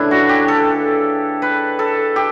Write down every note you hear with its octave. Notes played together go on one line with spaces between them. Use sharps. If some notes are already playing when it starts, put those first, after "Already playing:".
Already playing: C#3 E3 A3 D4 E4
F#4
G4
A4
B4
A4
G4